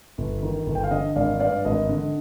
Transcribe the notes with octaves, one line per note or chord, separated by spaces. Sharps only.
G1
D#3
G1
G5
F5
D3 D#5
G#1 D5 F5
G2 D5 F5
G#1 D#5
D3